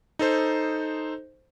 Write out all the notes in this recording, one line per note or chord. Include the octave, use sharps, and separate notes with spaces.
D#4 A4 C5